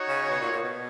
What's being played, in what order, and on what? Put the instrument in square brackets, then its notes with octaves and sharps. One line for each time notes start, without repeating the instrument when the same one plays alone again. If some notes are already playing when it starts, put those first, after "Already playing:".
Already playing: [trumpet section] D#4 F#4 C#5 F#5
[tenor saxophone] C#3
B2
A#2
A#2
B2